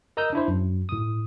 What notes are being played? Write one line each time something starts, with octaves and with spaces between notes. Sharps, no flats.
A#4 D#5 A#5 D#6 E6 G6
D4 E4 C5
F#2
A2 D#6